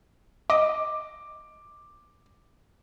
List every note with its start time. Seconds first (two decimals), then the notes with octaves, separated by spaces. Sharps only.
0.50 D#5 D6